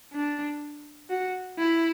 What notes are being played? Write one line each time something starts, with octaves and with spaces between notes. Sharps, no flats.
D4
F#4
E4